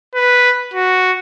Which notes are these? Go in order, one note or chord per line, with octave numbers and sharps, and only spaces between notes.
B4
F#4